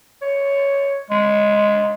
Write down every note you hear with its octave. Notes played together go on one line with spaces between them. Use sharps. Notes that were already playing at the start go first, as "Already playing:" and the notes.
C#5
G#3